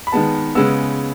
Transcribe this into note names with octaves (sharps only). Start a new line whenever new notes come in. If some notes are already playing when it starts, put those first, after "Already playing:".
B5
D#3 G#3 B3 A5
C#3 G#3 B3 E6